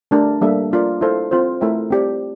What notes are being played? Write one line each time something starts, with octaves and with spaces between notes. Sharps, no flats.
A3 D4 G4 A#4
G3 A#3 D4 A4 E5
A#3 D4 F4 A#4 D5
E4 A4 C5 F5
C4 F4 C5
A3 E4 A#4 E5 G5
C4 G4 D5